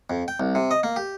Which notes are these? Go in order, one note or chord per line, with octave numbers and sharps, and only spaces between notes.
F2
G5
C2
C3
D#5
A#3
G4